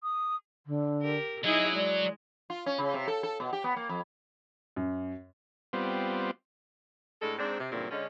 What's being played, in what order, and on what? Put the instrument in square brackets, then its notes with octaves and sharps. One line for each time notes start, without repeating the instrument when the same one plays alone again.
[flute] D#6
[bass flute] D3
[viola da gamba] G4 A#4
[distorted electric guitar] F#3 [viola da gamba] D#4 E4 G#4 [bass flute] D#5
[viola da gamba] G#3 [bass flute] D5
[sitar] F4
C#4
C#3
C3
A4
A4
B2
G4
B3
A#3
F2
[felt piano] F#2
[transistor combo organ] G3 B3 C4 F4
[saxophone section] A2 G#3 D4 A4
G#2 C4 D4
C3
G2 A#2 C#3 E3 F#3 C4
D3 G#3 C#4